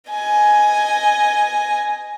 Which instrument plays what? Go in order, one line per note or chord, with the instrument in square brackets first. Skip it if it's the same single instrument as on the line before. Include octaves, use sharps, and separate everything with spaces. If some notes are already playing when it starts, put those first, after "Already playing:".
[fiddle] D#5 G#5